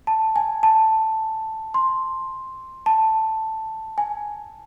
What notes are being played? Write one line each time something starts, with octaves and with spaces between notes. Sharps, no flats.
A5
G#5
A5
C6
A5
G#5